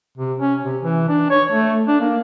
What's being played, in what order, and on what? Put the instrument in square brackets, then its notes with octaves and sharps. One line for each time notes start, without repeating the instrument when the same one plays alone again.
[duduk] C3
C#4
C3
E3
D4
C#5
A3
D4
A#3